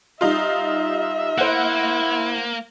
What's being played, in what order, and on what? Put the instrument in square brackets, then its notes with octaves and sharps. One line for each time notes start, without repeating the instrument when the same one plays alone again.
[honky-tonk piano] G3 D#4 F4 [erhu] E5
[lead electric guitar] A#3 [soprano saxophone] E4 [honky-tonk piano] C5 F#5